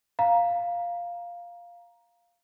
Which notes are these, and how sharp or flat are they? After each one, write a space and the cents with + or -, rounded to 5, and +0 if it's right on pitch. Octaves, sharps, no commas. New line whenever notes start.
F5 +0 A#5 +10